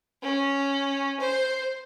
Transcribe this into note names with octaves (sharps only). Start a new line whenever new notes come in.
C#4
C5